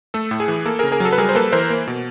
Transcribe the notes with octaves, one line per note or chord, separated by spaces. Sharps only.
A3 A4
A2
G#4
E3
A#3 A4
C#3 G#4 A#4
G#4 A#4
F#3 A4
B4
G3 G#4 A#4
C5
A#3 A4 B4
E3 A#4 C5
A#3
B2